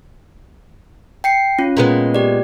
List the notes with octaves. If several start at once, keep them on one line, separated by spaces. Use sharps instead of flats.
G5 C7 C#7
C#4 F4
A#2 G#3 B3
G4 D5